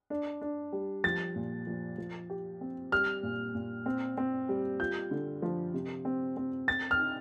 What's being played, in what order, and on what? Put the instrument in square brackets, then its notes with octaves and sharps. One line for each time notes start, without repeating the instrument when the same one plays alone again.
[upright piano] D4
D4
G3
[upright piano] F3 [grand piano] A6
[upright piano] A#2
F3
F3
G4
C4
[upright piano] G3 [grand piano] F6
[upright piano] A#2
A#2
C4
C4
G3
[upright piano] F4 [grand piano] G6
[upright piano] D3
F3
C3
C4
C4
[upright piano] C4 [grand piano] A6
[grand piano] F6
[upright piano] D#4